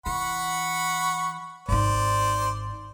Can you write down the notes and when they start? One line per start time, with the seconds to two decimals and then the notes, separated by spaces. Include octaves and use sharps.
0.06 E3 F#5 B5 C#6
1.69 G#1 D#4 C5 D5